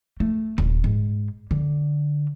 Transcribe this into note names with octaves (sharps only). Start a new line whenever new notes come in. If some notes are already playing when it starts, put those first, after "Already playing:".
A3
D#1
G#2
D3